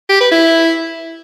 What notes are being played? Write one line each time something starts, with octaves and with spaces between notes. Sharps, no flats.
G4
B4
E4